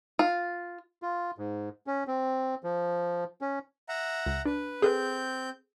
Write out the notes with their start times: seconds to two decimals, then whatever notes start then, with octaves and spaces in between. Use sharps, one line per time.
0.19 F4
1.02 F4
1.38 G#2
1.87 C#4
2.07 C4
2.63 F3
3.41 C#4
3.89 E5 F#5 A#5
4.26 C#2
4.46 D4 B4
4.82 C4 G#4 A4 B4 G6